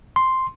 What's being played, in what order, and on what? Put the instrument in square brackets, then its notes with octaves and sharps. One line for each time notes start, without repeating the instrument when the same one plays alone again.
[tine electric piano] C6